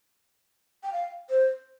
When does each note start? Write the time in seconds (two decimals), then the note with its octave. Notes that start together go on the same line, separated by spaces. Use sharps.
0.83 G5
0.93 F5
1.30 C5